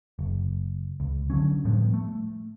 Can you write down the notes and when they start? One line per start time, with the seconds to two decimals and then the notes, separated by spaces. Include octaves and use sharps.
0.19 F#1
1.00 C#2
1.30 D3 E3 F#3 C#4
1.65 A2 F3 G3 B3
1.94 A3